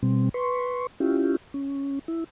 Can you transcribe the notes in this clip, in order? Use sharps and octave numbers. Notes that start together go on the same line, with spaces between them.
B2 G3 C4
B4 C6 C#6
C#4 E4 F4 G4
C#4
E4